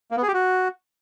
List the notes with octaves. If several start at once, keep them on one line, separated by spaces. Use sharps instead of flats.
A#3
B3
G#4
G4
F#4